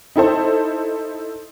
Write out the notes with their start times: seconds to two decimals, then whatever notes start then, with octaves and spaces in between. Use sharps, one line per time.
0.16 D#4 E4 A4 C5